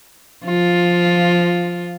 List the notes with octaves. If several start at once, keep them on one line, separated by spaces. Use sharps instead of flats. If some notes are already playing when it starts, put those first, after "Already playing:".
F3 F4